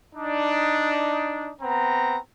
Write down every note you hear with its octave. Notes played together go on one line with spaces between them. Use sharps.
D4 D#4
B3 C4 A#5